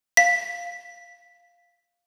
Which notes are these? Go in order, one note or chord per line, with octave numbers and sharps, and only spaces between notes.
F5 B6